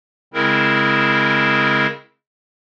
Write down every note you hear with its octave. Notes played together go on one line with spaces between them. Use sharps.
C#3 G#3 C4 E4 A#4